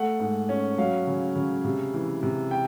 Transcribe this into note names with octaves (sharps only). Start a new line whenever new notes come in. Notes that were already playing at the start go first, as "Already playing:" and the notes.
Already playing: A3 F#5
G#2
C#4
F#3 F5
C#3
C#3
C3
E3
C3
G5